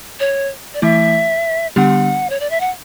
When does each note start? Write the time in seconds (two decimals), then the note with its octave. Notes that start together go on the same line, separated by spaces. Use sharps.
0.20 C#5
0.74 D5
0.82 E3 A3 E4 E5
1.76 D3 G3 B3 D4 G4 F#5
2.30 C#5
2.40 D5
2.50 E5
2.60 F#5